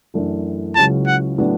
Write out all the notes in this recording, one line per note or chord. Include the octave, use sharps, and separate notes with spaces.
F#2 E3 A3 D4
C#2 C#3 F#3 C#4 E4 A5
F#5
A2 F#3 B3 D4